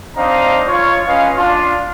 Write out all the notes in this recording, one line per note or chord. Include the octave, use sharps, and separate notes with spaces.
C4 D4 D#4 D#5 F5 A#5
F4 C#5
C#4 B4 D#5 F5
D4 F4